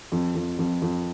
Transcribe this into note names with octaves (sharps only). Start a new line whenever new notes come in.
F2
F2
F2
F2